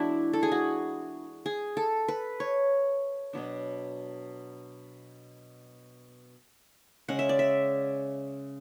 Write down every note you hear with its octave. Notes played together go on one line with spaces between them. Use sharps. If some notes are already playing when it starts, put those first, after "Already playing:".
Already playing: E3 G#3 B3 D4 E4 F#4
A4
G#4
F#4
G#4
A4
B4
C#5
B2 F#3 B3 D4
C#3 G#3 C#4 F#5
E5
D5
E5